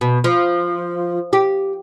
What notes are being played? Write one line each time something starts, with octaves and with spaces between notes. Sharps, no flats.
B2
F3
G4